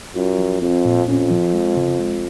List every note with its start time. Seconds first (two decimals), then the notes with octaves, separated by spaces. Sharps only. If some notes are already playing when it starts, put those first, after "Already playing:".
0.16 F#2 F4
0.38 F3
0.62 F2 C4
0.85 A#2
1.08 F2 C#4
1.31 F3
1.54 G#3
1.77 C#3
2.00 G#3